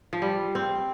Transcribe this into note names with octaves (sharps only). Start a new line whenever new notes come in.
F3
G3
C4